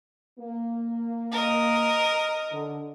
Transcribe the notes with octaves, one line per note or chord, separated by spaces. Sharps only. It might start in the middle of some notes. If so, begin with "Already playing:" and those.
A#3
A#4 D#5
D3